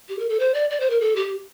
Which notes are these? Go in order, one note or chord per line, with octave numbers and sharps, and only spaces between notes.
G4
A#4
A4
C5
D5
D5
C5
A#4
A4
G4